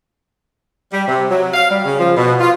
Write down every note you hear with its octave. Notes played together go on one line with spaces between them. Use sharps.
G3
C3
F#3
F5
G3
C#3
F3
B2
F4